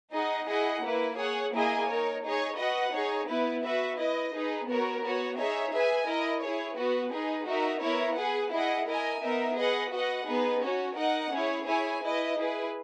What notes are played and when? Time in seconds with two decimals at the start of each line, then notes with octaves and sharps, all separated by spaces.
0.13 D#4 G#4 D#5 F#5
0.48 E4 G#4 D#5 F#5
0.83 A#3 E4 B4
1.18 G#4 C#5 F#5
1.52 A#3 E4 G#4 D#5 G#5
1.88 D#4 A#4 C#5
2.23 D#4 G#4 C#5
2.57 F#4 B4 D#5 F#5
2.92 D#4 G#4 C#5
3.28 B3 E4 B4
3.63 F#4 B4 E5
3.97 E4 B4 D#5
4.32 D#4 G#4 B4
4.68 B3 F#4 A#4 C#5
5.02 B3 F#4 C#5
5.37 D#4 G#4 C#5 E5
5.72 G#4 B4 E5 G#5
6.07 E4 A#4 D#5
6.42 E4 G#4 C#5
6.77 B3 F#4 B4
7.12 D#4 G#4 B4
7.47 D#4 F#4 A#4 E5
7.82 B3 E4 A#4 C#5
8.17 G#4 B4 F#5
8.52 E4 G#4 D#5 F#5
8.87 E4 A#4 D#5 G#5
9.22 B3 D#4 A#4 E5
9.57 G#4 B4 D#5 F#5
9.92 F#4 B4 D#5 F#5
10.26 B3 D#4 G#4 B4
10.62 C#4 F#4 C#5
10.97 D#4 A#4 D#5 F#5
11.31 C#4 E4 G#4 C#5
11.67 E4 G#4 C#5 E5 G#5
12.02 E4 B4 D#5
12.37 E4 G#4 B4